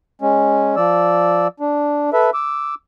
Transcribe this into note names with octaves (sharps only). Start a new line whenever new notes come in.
G#3 C#4
F3 D5 E6
D4
A4 B4 E5
D6 E6